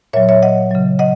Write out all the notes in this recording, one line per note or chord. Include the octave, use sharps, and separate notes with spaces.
A#2 F#3 C#5 E5
C#5 E5
D#5 F#5
C#3 F#3
D#5 F#5